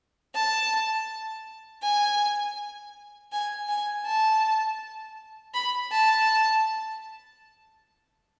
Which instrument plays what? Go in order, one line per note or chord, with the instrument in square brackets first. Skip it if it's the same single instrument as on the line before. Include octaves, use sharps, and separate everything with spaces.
[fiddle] A5
G#5
G#5
G#5
A5
B5
A5